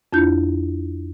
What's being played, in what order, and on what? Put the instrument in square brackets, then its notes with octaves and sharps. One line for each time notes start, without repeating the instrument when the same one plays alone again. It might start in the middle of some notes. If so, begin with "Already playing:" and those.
[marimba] F2 D4 E4 F4 G6